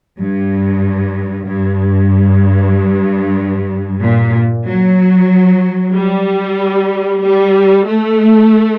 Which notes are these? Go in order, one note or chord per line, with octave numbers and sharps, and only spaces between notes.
G2
G2
A#2
F#3
G3
G3
A3